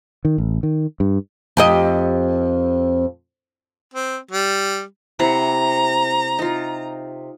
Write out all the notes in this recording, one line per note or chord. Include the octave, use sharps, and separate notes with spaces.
D#3
A1
D#3
G2
F2 G4 D#5
C4
G3
C3 E4 F#5 A#5
D#4 F4